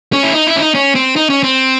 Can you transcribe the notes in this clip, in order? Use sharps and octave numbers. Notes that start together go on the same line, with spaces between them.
C#4
E4
D#4
E4
C#4
D#4
C#4
C4
D#4
C#4
C4